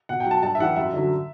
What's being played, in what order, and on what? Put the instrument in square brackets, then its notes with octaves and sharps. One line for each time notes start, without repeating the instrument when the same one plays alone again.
[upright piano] B2 F#5
G5
F#3
A5
G2 A5
E5
E3 G3 F#5
F#2 E5
D3 F#3